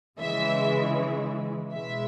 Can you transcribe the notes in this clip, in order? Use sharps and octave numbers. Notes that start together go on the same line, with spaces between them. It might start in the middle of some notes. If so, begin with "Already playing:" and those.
C#3 E3 G#3 E5
B2 G#3 E5